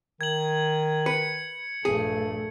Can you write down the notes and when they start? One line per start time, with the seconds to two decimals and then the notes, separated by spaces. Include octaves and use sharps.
0.21 D#3 G#6 F#7
1.06 B4 C#7
1.85 A#1 G2 A3 G#4